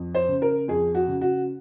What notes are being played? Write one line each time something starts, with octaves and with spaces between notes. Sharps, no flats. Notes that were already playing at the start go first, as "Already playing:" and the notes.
Already playing: F2
C5
C#3
A#4
F2 G#4
F#4
C#3
F#4